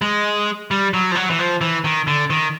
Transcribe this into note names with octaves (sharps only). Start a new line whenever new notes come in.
G#3
G3
F#3
F3
F#3
E3
F3
E3
D#3
D3
D#3